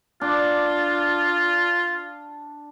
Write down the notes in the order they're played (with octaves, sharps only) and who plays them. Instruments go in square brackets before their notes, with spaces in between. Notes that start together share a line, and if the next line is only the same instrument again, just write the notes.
[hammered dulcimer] D4 [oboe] F4